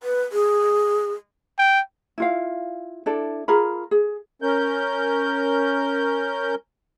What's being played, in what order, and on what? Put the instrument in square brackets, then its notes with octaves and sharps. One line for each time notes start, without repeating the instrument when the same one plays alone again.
[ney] B4
G#4
[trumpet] G5
[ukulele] E4 F4 F5
D4 E4 A4 D5
F4 G#4 A#4 B5
G#4
[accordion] C#4 A#4 G6